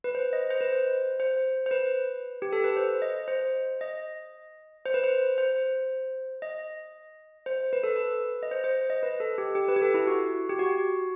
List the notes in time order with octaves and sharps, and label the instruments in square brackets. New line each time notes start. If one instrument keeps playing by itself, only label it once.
[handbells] B4
C5
D#5
C5
B4
C5
C5
C5
B4
G4
A4
B4
C5
D#5
C5
D#5
C5
B4
C5
C5
D#5
C5
B4
A4
B4
D#5
C5
C5
D#5
B4
A4
G4
G4
B4
G4
A4
E4
F#4
G4
F#4